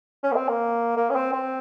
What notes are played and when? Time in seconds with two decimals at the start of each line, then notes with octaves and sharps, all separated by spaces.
0.23 C#4
0.32 A#3
0.36 C4
0.48 A#3
0.97 A#3
1.10 C#4
1.15 C4
1.33 C4